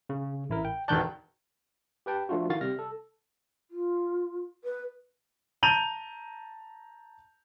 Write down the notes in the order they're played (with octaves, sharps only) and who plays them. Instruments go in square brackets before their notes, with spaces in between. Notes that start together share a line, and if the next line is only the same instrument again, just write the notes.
[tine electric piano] C#3
A1 E4 A#4
G5
[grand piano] E1 D#3 A5 [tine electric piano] D5 F#6 G6
[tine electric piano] G4 B4 G5 A5
F3 A3 D4 F4 F#4
D#3 E4 F#4 F5 A6
C3 G3 F6 A#6
A4
[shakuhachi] F4
B4
[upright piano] A5 A#5 G6 D#7 F7